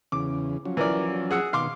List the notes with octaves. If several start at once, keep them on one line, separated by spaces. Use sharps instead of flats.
E2 C#3 D6
F3 F#3 C#4
E3 A#4 D5
G#4 F#5 E6
B2 D#3 F5 C6 D6